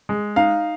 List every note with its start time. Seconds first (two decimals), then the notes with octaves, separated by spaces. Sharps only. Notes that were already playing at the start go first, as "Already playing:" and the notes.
0.09 G#3
0.36 D#4 F5